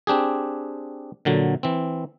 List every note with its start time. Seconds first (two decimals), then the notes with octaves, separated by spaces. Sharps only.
0.07 C4 D4 G4 G#4
1.25 A#2 D3 F#3
1.63 E3 C4